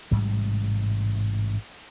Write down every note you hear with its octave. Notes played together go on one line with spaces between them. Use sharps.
A1 G#2 C3 G3